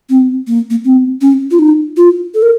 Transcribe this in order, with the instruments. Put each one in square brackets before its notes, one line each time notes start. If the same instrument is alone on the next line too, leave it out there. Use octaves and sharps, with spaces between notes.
[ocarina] C4
A#3
A#3
C4
C#4
F4
D#4
F4
A4
A#4